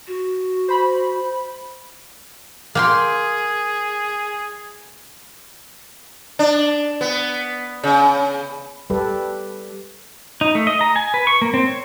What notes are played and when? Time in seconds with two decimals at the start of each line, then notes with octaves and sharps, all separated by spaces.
0.07 F#4
0.68 C5 B5
2.75 A#3 G#4 G5 C6
6.39 D4
7.01 B3
7.84 C#3
8.90 G3 G4 A4 B4
10.41 D#4
10.55 A3
10.67 D#5
10.81 A#5
10.96 G#5
11.14 B4
11.27 C#6
11.42 A#3
11.54 C4
11.67 C#5